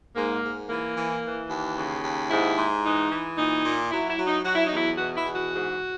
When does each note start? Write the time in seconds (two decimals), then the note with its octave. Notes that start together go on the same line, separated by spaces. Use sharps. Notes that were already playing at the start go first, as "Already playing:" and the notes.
0.16 G#2 A#3
0.43 G#2
0.69 E3 A#3
0.96 E3
1.23 E3
1.49 D#2
1.77 C#3
2.03 D#2
2.30 G#2 E4
2.57 G#2
2.84 E3 D#4
3.11 E3
3.38 A#2 D#4
3.64 A#2
3.91 F#3 E4
4.09 E4
4.18 F#3
4.27 D#4
4.45 F#3 F#4
4.55 E4
4.66 D#4
4.71 E2
4.77 E4
4.98 B2 F#4
5.17 E4
5.25 E2
5.34 F#4
5.53 G#2